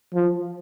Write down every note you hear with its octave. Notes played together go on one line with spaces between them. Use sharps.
F3